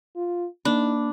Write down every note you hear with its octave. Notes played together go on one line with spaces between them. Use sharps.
F4
A#3 D4 D#4 B5